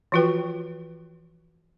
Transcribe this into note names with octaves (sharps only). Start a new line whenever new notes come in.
E3 F3 F4 F#4 B4 G5